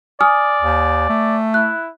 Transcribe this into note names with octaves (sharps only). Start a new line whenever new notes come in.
D5 G#5 D#6 F6
D#2
A3
E4 F#6